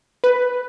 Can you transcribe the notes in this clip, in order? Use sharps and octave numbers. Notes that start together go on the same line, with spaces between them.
B4